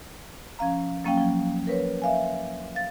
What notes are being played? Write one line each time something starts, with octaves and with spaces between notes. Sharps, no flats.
F3 C#4 F5 A#5
F#3 A#3 C#4 F5 G5
F3 F#3
A#4 B4 C#5
E5 F5 G#5
F5 A6